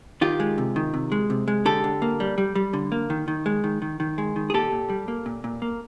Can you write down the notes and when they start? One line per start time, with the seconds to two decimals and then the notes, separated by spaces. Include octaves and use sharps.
0.21 D#3 F4 G4
0.40 G#3
0.58 C3
0.76 D#3
0.94 C3
1.12 G#3
1.30 C3
1.48 G#3
1.65 D3 G4 A4
1.84 D3
2.02 A#3
2.20 G3
2.38 G3
2.55 G3
2.74 D3
2.92 A#3
3.10 D#3
3.28 D#3
3.46 G#3
3.64 D#3
3.82 D#3
4.00 D#3
4.18 G#3
4.36 D#3
4.50 G#4
4.54 A#2 G4 A4
4.72 A#2
4.90 G3
5.08 A#3
5.26 A#2
5.44 A#2
5.62 A#3